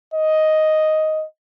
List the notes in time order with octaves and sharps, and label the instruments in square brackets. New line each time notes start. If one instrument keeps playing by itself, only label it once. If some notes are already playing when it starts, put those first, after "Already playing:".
[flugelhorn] D#5